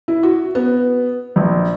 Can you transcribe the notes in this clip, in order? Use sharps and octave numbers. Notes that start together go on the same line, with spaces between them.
E4
F#4
B3
A#1